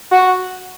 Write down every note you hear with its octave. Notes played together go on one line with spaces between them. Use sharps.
F#4